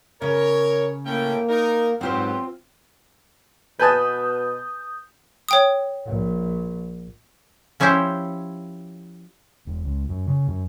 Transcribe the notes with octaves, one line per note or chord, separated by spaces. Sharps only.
C#3 A#4 C#5
A2 A#3 C#4 G5
D#4 A#4
G#2 F#3 B3 C4 F4 G4 C5
B2 B4 G#5 A5 D#6 G6
C#5 G5 D#6
A#1
F3 C#4 E4 G4 C5 C#5
E1
C#2
F#2
C#3
F#2